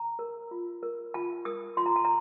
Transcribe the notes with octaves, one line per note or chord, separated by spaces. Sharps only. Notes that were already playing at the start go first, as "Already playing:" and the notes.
Already playing: A#5
A#4
F4
A#4
F4 A5
A#4 D#6
F4 C6
A#5
A5
A#5